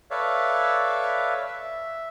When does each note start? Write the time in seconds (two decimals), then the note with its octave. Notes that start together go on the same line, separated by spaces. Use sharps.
0.11 A4 B4 C#5 D5 E5 F5
1.47 E5